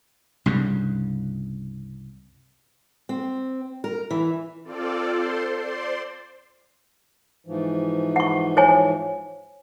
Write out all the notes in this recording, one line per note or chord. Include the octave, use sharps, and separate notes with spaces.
C2 G2 C#3
C4
A#4
E3
C4 F4 A4 D5
A4 C5 C6
C5 D5 C6
G#2 E3 F3
F#5 C#6
C5 C#5 G#5